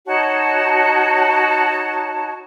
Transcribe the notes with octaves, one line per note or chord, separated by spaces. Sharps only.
D#4 F#4 C#5 A5